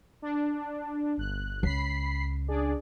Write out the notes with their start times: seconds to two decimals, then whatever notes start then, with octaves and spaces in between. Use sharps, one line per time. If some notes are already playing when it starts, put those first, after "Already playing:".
0.22 D4
1.18 G1 F#6
1.63 C#2 B5 B6 C7
2.48 D4 G#4 D5